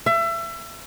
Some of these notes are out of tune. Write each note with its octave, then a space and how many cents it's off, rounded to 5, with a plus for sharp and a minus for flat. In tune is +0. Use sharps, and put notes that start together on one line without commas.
E5 +30